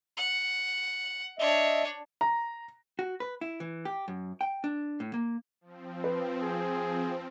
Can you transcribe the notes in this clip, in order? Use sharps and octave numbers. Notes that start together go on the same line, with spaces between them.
F#5
D4 C#5 D#5 E5
A#5
F#4
B4
E4
E3
G4
F#2
G5
D4
A2
A#3
F3 C4
B4
G#4